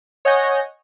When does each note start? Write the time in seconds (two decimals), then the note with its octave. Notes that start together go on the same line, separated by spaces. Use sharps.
0.25 C#5 D#5 F#5 G#5 G6 A#6